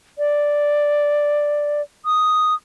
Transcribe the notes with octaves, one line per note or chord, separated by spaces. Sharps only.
D5
D#6